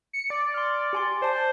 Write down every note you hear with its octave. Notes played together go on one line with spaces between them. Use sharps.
C#7
D5
C6 F6
G4 G#5 C6
C5 D5 A5